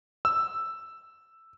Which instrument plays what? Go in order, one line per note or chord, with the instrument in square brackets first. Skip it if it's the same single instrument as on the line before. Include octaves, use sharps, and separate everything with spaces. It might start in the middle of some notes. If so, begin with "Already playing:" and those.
[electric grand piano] E6